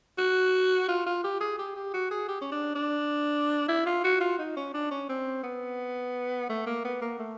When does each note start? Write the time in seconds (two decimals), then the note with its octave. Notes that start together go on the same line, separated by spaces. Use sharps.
0.18 F#4
0.88 F4
1.06 F4
1.24 G4
1.41 G#4
1.59 G4
1.76 G4
1.94 F#4
2.11 G#4
2.28 G4
2.41 C#4
2.52 D4
2.75 D4
3.68 E4
3.86 F4
4.04 F#4
4.21 F4
4.39 D#4
4.57 C#4
4.74 D4
4.91 C#4
5.09 C4
5.43 B3
6.49 A3
6.67 A#3
6.84 B3
7.02 A#3
7.19 A3